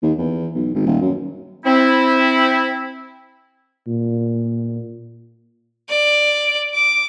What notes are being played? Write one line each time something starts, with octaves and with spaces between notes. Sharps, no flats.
D#2
E2
B1
G#1
D#1
F#2
C4 E4
A#2
D5
D6